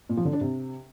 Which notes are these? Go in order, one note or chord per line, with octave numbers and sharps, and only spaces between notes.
A#2
F3
D3
D4
C3